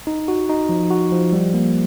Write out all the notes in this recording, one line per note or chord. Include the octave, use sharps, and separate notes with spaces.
D#4
F#4
D#4
F3
F#4
F3
G3
A#3